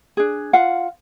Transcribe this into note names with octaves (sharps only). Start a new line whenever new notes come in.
D4 G#4
F4 F5 F#5